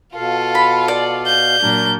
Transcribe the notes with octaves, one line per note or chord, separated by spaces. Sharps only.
B2 F4 A4 F5
B5
D5
G6
A#2 F#3 D4 A#4